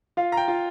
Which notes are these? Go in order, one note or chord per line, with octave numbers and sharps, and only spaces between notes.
F4 F5
A#5
G5
F4